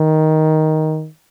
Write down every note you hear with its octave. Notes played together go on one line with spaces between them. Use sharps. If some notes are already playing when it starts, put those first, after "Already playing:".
Already playing: D#3